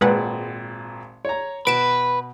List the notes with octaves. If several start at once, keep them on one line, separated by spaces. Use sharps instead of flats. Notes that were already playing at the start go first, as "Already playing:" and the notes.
G#1 A#2 G#3 B4 F#5
C#5 A#5
B2 B4 D7 E7